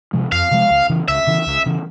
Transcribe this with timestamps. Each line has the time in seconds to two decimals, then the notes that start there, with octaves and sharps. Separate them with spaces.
0.13 C3 F3 G#3
0.32 F2 F5
0.51 C3 F3 G#3
0.70 C#2
0.90 C#3 E3
1.08 C#2 E5
1.27 C#3 E3
1.46 C#2
1.66 C#3 E3